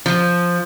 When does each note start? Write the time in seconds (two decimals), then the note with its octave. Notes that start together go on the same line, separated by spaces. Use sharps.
0.06 F3